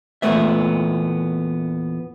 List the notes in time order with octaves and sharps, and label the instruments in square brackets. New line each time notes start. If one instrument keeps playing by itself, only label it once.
[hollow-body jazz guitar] E2 A#2 F#3 A3 B3 E5